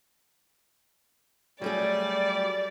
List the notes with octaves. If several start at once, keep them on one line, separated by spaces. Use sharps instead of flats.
F#3 G3 A3 G#4 D5